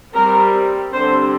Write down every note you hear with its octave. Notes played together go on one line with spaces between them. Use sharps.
G3 C4 A#4
D3 G3 C4 C5